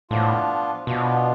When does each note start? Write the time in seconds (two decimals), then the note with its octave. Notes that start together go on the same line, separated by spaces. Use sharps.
0.10 A2 F3 B3 D4 F4
0.87 B2 F3 B3 D4 F4